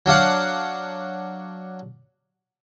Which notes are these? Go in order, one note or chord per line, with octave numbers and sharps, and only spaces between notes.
F#3 D4 F5 F#5